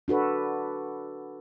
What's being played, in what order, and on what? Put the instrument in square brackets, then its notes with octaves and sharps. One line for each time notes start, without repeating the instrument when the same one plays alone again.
[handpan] D4 F#4 A4 B4